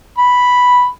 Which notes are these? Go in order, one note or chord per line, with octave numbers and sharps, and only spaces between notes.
B5